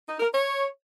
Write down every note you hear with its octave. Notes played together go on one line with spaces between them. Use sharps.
D#4
A#4
C#5